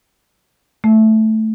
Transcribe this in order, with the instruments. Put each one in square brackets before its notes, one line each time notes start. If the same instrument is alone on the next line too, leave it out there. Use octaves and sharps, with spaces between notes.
[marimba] A3